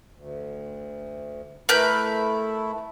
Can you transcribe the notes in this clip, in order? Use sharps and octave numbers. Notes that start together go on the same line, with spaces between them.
D2
A3 E4 A#4 B4 G6